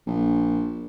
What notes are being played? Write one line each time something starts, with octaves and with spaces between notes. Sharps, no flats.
A#1